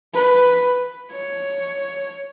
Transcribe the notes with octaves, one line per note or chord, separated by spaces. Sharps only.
B4
C#5